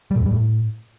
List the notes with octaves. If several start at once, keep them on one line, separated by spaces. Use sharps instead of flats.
G3
A#2
E2
G3
A2